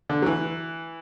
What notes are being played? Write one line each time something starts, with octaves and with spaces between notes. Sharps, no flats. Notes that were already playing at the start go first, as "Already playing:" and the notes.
D3
F#3
E3